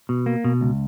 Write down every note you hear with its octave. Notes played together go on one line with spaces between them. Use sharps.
B2
A#3
B2
C#2